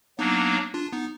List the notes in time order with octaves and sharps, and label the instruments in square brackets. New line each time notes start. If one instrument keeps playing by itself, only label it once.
[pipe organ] F#3 A#3 D4 [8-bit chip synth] B3 D#4
[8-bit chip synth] D4 F4
B3 D#4